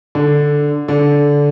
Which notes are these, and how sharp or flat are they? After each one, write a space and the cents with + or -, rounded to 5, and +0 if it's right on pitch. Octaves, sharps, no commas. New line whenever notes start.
D3 +0
D3 -15